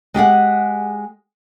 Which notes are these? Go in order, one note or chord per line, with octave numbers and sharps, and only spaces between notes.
G#3 G4 G#4 F#5